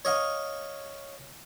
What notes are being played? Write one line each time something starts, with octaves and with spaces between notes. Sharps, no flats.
C#5 D#5 F5